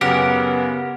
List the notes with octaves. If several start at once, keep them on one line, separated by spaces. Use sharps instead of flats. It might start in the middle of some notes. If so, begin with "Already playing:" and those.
F#2 C#3 B3 G4 A#4 F#5